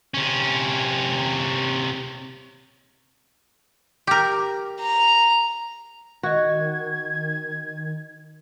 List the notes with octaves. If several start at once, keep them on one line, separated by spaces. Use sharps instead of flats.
C3 C#4
G4 A#4
A#5
D#3 F#4 D#5 E5 G#6